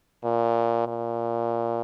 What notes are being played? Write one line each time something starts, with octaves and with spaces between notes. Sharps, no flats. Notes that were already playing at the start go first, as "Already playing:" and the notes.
A#2
A#2